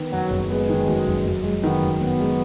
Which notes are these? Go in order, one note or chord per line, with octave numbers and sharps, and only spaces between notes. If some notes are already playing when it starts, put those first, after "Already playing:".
Already playing: D#3 B3
F#2 F#3
F#1
G#3 B3
D#3
F#2
F#1
F#2
G#3
D#3 B3
F#2
F#2 B3
G#3